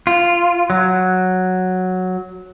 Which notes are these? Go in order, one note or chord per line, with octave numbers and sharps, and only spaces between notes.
F4
F#3